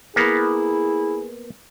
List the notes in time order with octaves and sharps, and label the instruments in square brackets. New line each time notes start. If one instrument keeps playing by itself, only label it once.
[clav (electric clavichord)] A#3 B3 [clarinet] E4 [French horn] G#4